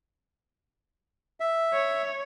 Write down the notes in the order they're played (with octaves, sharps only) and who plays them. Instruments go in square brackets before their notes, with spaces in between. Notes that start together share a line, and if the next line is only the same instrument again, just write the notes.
[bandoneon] E5
[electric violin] C#5